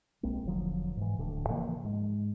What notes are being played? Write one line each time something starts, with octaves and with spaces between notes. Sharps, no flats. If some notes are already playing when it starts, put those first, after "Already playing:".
B1 G#3 A#3 C4
E1 D3 F3 F#3
G#2 E3
D1 D2 A2 D3
C#3 E3 F3 A#3
G#2 G#3